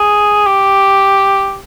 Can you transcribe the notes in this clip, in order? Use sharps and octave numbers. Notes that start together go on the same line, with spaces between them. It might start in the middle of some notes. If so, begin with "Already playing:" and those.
Already playing: G#4
G4